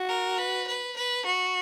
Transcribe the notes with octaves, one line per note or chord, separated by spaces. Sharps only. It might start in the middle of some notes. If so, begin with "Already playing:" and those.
Already playing: F#4
A#4
B4
B4
B4
F#4